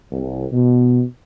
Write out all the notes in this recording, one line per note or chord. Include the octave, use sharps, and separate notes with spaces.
C2
B2